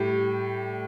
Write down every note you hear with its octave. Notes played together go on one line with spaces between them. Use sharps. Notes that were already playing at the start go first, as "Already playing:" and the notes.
Already playing: A2 G3 G4